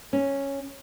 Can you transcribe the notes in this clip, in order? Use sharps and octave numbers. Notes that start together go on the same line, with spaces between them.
C#4